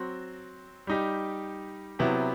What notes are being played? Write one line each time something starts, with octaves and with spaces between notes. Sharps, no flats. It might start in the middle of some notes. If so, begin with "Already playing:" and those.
Already playing: F#3 C4 F#4
G3 D#4 G4
C3 F#3 B3 E4 G4